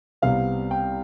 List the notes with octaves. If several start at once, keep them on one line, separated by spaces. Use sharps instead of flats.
C2 C3 G3 B3 F5
G5